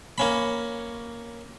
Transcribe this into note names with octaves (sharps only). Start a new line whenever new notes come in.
A#3 C#4 B5